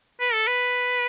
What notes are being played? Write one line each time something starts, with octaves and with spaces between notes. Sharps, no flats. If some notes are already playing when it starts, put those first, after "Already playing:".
B4
A4
B4